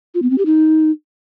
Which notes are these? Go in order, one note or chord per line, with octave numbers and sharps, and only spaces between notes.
F4
B3
C4
G4
D#4